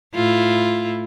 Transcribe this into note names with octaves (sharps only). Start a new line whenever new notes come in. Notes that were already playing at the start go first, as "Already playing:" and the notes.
A2 E4 F4